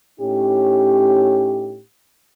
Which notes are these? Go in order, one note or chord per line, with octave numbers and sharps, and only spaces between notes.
A2 C#4 D#4 G4